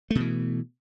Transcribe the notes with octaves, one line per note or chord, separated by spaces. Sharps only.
B2 E3 A3